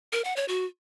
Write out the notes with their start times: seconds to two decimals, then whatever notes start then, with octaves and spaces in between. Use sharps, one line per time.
0.13 A#4
0.24 F#5
0.36 C#5
0.48 F#4